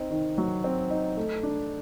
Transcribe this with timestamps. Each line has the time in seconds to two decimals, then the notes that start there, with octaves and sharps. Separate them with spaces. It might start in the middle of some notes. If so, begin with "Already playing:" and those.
Already playing: C4 D#4
0.11 D#3
0.38 F#3
0.64 C4
0.90 D#4
1.17 A3
1.43 D4